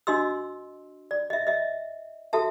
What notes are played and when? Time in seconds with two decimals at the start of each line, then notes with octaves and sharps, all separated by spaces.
0.07 D4 F#4 D#5 C6 E6
1.11 D5
1.30 D#5 E5
1.47 D#5 E5
2.33 F#4 A4 E5 A5